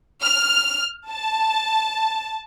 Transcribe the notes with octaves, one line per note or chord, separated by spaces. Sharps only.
F6
A5